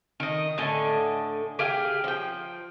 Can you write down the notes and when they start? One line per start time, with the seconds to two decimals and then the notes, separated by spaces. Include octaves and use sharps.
0.20 D#3 D#5
0.58 A2 D3 D#5 G#5
1.59 G4 G#4 F5 G5
2.04 F3 G5